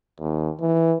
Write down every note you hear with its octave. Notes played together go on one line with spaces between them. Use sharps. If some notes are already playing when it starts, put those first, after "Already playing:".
D#2
E3